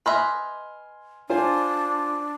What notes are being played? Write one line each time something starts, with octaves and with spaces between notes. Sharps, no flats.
B4 D#5 E5 G#5 C6 F6
D4 F4 C5 G#5